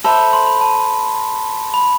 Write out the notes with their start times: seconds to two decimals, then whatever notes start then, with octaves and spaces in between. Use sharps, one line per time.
0.04 A4 C5 E5 B5
0.19 B5
0.33 C6
0.47 B5
0.61 A5
1.74 B5